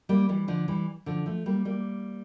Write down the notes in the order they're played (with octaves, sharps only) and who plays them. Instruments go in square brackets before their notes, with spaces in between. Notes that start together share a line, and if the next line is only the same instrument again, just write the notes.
[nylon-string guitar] G3 A#3
E3 G3
D3 F3
E3 G3
D3 F3
F3 A3
G3 A#3
G3 A#3